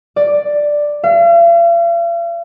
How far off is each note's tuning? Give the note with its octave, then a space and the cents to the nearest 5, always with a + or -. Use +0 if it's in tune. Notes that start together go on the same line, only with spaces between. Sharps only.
D5 +5
F5 -45